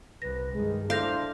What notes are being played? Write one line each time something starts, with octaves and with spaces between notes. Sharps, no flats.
C2 C3 B4 A#6
G2 D#3 G#3
D4 E4 A4 C5 F5 G6 A#6